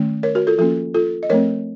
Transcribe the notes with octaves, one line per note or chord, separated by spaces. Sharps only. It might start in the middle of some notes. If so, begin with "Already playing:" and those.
Already playing: D#3 A3 C#4
A#4 C#5
F#4 A#4
F4 A4
F3 A#3 C#4 F4 A4
F4 A4
D#5
F3 A3 C4 A#4 C#5